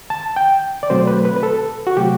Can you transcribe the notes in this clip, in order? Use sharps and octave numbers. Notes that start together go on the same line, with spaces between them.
A5
G5
D5
B2 F#3 A3 C4 C5
B4
B4
B4
A4
F#4
C3 F#3 A3 G4